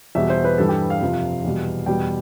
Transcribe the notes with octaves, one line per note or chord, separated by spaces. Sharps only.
E2 B2 G3 E5
C5
B4
G2 E3 G3 A4
G4
F5
F2 C3 F3
E2 B2 G3
E2 B2 G3 G5